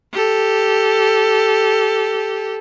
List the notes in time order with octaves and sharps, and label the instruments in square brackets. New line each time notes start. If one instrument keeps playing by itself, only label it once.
[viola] G4 A4